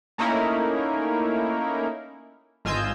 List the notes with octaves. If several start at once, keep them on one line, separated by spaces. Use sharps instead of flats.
A3 A#3 C#4 D#4 E4 A#4
G#1 F4 D#5 G#5 E6 G6